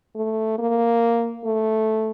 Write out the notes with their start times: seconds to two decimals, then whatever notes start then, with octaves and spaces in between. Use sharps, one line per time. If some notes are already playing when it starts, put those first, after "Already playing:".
0.16 A3
0.59 A#3
1.45 A3